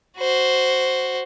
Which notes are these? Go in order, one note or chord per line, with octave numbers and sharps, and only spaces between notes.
F#4 C5